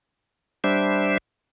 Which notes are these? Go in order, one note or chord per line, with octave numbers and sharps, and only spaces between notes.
G3 D4 C5 E5